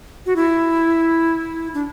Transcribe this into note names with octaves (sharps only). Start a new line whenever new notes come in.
F#4
E4
D4